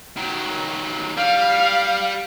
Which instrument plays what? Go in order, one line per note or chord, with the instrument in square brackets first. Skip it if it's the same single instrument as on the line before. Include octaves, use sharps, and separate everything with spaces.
[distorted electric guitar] D#3 F#3
[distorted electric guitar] G3 [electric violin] F5